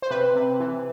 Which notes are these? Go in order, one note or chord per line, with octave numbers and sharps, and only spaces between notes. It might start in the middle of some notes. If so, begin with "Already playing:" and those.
C5
C3 B4
C3
E3